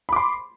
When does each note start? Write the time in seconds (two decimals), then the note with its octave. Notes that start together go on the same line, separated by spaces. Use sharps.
0.09 B5
0.13 D6
0.16 C6